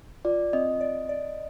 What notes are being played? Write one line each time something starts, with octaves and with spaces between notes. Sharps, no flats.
F4 D5
C4 D#5
D5
D5